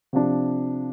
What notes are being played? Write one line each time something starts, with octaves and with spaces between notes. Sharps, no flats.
C3 F3 D4